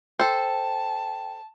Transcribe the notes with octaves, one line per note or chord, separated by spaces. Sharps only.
A4 C5 G5 A5